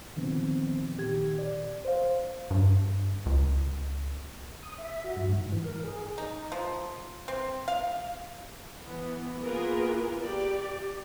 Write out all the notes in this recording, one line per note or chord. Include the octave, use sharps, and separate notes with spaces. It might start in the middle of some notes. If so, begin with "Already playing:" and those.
A#2 D3 D#3 F3 B3 C4
A#2 D#3 G4 G#6
D5
C5 F5
G2
C#2
D#6
E5
F#4
G2
G#2
E3
A#4
G#4
D#4
F3
C4
F5
E3 B3
A#3 B3 F4 G#4 A#4 B4
G4 D5